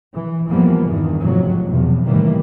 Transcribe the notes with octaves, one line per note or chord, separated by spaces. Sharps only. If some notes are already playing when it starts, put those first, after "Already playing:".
E3
F2 E3 F3 G3 A#3 B3
E2 G2 D3 D#3
A1 F2 G#2 C3 F#3
B1 E2 C3 F3
A2 C3 D#3 E3 G3 A#3